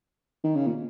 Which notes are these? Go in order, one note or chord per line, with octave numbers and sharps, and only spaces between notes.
D#3
C#3
A#2